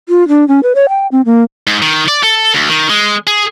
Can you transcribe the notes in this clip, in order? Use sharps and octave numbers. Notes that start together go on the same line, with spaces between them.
F4
D4
C#4
B4
C#5
G5
C4
A#3
G#2
D#3
D5
A4
D2
D#3
G#3
G#4